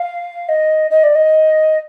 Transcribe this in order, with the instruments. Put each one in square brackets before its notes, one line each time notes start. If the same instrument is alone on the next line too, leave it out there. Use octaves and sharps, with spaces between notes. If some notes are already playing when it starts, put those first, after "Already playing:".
Already playing: [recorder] F5
D#5
D#5
D5
D#5